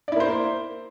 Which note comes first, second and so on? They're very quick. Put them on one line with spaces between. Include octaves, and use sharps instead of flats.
D5 E4 A#3 C5